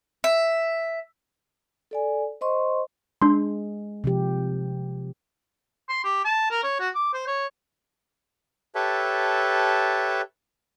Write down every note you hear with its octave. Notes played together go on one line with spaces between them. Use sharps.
E5
A4 D5 G#5
C5 D#5 C6 C#6
G#3 D4 C6
C3 F3 G4
C6
G4
A5
A#4
C#5
F#4
D6
C5
C#5
G4 A4 B4 C#5 E5 A5